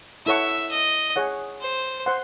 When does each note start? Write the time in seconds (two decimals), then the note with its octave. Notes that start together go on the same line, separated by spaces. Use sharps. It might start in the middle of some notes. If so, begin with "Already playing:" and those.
0.26 E4 A4 C#5 E5 F#5 C#6
0.71 D#5
1.16 G#4 C#5 F#5
1.61 C5
2.06 C5 F#5 C6